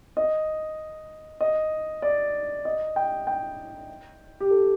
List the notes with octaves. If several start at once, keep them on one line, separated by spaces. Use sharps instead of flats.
D#5
D#5
D5
D#5
G5
G5
G4
A4